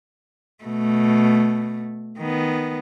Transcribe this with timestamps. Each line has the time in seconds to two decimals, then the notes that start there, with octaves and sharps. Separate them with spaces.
0.64 B2 A3
2.18 D#3 B3